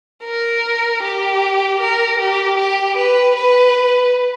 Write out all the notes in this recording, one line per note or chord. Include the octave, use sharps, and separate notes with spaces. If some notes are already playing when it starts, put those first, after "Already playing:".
A#4
G4
A#4
G4
G4
B4
B4